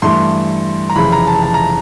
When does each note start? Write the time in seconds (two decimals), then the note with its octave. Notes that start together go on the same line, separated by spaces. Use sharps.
0.02 G2 E3 A3 C6
0.90 A#5
0.96 F1 F2 C#3 E3 B5
1.12 A#5
1.27 A5
1.43 A5
1.54 A#5